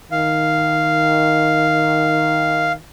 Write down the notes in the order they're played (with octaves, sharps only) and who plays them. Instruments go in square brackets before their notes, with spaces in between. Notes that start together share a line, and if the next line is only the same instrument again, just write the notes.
[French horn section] D#3 [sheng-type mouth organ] F5